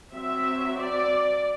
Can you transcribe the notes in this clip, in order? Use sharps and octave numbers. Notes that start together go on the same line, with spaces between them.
F#3 C4 E5
D5